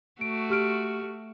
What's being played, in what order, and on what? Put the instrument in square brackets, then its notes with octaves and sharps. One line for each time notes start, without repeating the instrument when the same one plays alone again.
[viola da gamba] A3 F#4 [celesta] D7
[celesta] G4 F6 D7